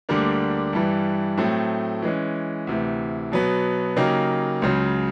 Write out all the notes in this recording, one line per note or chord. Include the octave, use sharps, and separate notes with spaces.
D2 D3 G3 A#3 D4
G2 E3 G3
A2 F#3 A3 C4
E3 G#3 C#4
D2 C3 E3
B2 F#3 B3
C#3 F#3 A#3 D#4 G4
C#2 C#3 F#3